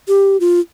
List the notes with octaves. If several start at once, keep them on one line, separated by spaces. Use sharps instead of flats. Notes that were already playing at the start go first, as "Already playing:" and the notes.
G4
F4